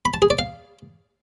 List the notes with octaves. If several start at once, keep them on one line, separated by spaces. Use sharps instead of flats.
B5
A5
G#4
D5
F5